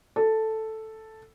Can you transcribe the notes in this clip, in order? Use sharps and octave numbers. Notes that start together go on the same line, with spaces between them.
A4